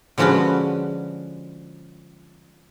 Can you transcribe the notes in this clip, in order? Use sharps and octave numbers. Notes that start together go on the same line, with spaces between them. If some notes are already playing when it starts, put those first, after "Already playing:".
D3 F3 G#3 C#4 F#4 B4